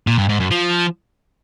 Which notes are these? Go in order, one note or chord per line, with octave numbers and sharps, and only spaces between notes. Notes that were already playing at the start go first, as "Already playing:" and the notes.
A#2
G2
G#2
F#2
F3